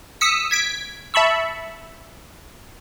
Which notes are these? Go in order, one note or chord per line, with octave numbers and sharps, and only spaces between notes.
D#6 E6 B6 C#7
G#6 B6 D7
E5 A5 B5 C#6 E6